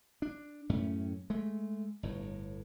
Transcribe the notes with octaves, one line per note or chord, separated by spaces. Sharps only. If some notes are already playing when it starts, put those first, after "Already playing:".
D4
F#2 A2 A3 C#4
G#3 A3
G1 A2